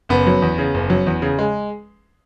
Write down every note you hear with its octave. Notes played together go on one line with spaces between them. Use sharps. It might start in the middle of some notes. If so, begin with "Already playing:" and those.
F#1 B3
F#3
E2
C#3
F#1
F#3
E2
C#3
G#3